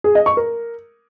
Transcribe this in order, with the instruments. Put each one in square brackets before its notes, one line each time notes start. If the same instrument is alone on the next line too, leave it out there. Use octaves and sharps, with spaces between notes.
[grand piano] G#4
D#5
C#6
A#4